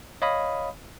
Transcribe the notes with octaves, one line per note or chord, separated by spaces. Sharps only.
C#5 D#5 F5 B5 D#6